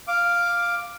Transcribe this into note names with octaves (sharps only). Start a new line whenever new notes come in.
F5 D6